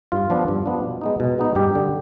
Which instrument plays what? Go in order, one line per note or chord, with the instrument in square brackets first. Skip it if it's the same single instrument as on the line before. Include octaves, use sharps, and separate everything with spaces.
[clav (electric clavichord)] G2 F4
F3 B3 D4
G2
F3 B3 D4
B2
G#3 B3 D#4
B2
G#3 B3 D#4
G2 G4
D3 G3